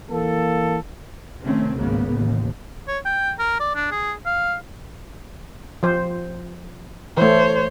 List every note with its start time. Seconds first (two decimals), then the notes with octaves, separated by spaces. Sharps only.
0.12 E3 A#3 A4
1.43 C3 D#3 A3 C4 C#4
1.75 G#1 C#2 A2 C#3 A#3 B3
2.12 A1 D#2
2.88 C#5
3.05 G5
3.39 A#4
3.60 D5
3.75 D4
3.91 G#4
4.26 F5
5.83 F3 C5
7.17 E3 A3 C5 C#5